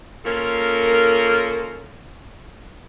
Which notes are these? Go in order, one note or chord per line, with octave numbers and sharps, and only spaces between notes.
A#3 C#4 F4 A4 A#4